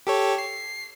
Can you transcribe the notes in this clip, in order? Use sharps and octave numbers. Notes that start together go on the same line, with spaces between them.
G4 A4 C#5
C7